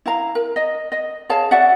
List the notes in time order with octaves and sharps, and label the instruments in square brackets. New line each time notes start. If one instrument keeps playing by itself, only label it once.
[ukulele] E4 F5 A#5
A#4
D#5
D#5
G#4 C#5 F5 A5
F#4 D5 E5 F#5